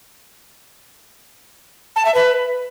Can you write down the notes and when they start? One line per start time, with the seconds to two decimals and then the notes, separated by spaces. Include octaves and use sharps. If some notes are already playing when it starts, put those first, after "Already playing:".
1.96 A5
2.05 E5
2.15 B4